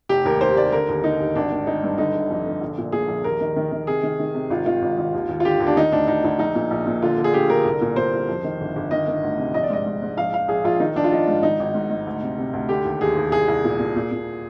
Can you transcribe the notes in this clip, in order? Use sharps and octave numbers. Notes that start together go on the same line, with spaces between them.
F1 G4
D#2 A#4
D#2 C5
F1 D5
D3 A#4
D#2
D3 D#4
D#2
G#1 D4
D#3
D#3 D#4
G2
D3 D#4
G1
F2
D3
A#1
A#2
A#2 G#4
A#1
D#2 A#4
D#3
D#3
D#3
C3 G#4
D#3
D#3
C3
G#1 F4
D#3 F4
G#1
G#1
D#2
D#2
F4
D3 G4
D#2
D4
D#3 D#4
D2 D4
D2 D#4
D2 D#4
A#1 D#4
A#2
A#1
A#2
D3 F4
D3
G#4
D3 G4
D3 A#4
C2
A#2
A#2 C5
C2
F2
D#3
G1
G1
D#3 D#5
D#3
D2
C3
A#1 D#5
D5
G#2 D#5
G#2
G#2
A#1 F5
A#1 F5
A#1 G#4
A#1 F4
D#3 D#4
A#1 D4
F4
A#1 D#4
G#2
G#1 D#4
G#1
G#2
G#2
D2
C3
C3
D2
D3 G4
D#2
D#2 G#4
D#2
C2 G#4
C2
A#2
A#2
A#2
A#2